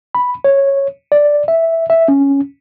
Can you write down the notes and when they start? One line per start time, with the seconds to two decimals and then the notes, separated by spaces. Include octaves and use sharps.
0.15 B5
0.44 C#5
1.12 D5
1.48 E5
1.90 E5
2.08 C#4